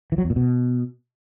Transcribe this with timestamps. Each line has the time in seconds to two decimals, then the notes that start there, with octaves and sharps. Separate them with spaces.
0.12 E3
0.18 F#3
0.24 E2
0.30 A#2
0.36 B2